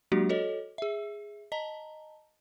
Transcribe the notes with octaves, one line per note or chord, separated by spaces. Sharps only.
F#3 G#3 A#3 D4 F#4 G4
F#4 A4 C#5 D#5
G#4 E5
D#5 A5 A#5